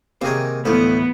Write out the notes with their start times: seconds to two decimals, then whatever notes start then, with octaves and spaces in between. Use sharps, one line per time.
0.21 C3 D#3 A#3 G#4 C#5
0.65 D2 A2 E3 F3 A3 B3